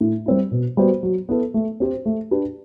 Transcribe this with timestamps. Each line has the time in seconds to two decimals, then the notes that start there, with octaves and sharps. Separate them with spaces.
0.01 A2
0.26 G3 C4 E4
0.51 B2
0.77 G3 B3 F#4 C5
1.03 F#3
1.29 B3 E4 A4
1.54 A3
1.80 C4 G4 C5
2.06 A3
2.31 D4 G4 B4